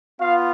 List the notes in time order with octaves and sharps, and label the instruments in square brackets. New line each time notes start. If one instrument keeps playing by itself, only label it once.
[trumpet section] B3 F4 F5